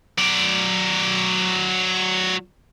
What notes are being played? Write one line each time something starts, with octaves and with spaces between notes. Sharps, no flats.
F#3 D5